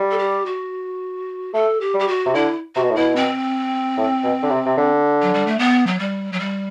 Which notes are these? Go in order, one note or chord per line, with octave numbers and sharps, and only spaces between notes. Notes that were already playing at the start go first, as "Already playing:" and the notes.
Already playing: G3
A4
G4
F#4
A3 A4
G4
G3 G4
F#4
C3
D3 E4
C3 F#4
B2
A2
B2 E4
C4
A2
B2
D3
C3
C3
D3
F#3
G3
A3
B3
F#3
G3
F#3
G3